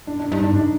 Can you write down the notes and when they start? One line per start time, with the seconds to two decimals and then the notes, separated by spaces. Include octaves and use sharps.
0.07 D4
0.20 D4
0.32 G2 D#4
0.44 D4
0.56 D4